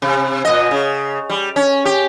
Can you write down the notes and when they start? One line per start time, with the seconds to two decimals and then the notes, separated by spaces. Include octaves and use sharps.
0.02 C3
0.45 A#2 D#5
0.71 C#3
1.29 G3
1.56 C#4
1.85 G4